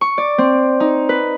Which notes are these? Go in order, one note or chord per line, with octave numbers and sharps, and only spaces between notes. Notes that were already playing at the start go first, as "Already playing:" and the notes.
C#6
D5
C4
D#4
B4